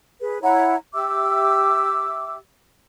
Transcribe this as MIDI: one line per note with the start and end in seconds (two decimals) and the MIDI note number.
0.21 0.40 68
0.21 0.40 71
0.42 0.75 64
0.42 0.75 73
0.42 0.75 78
0.42 0.75 82
0.94 2.36 67
0.94 2.36 76
0.94 2.36 86
0.94 2.36 88